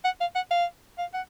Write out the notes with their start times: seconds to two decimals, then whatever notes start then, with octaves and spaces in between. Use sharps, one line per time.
0.05 F#5
0.21 F5
0.35 F#5
0.51 F5
0.98 F5
1.14 F#5